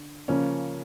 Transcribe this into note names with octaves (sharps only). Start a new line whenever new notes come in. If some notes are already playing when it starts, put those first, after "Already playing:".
Already playing: D3
C#3 F3 A#3 C#4